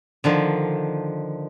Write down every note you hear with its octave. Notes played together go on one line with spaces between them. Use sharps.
D3 D#3 F3